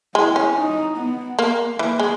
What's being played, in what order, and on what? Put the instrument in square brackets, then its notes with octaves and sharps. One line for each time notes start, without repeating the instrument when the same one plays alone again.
[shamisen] G#3 [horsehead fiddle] E4
[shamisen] C#4
[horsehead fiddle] D#4
B3
[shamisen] A#3
[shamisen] E3 [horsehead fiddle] A#3
[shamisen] G#3